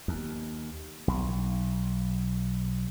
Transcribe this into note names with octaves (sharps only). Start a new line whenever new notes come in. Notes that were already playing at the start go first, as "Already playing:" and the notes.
D#2
B1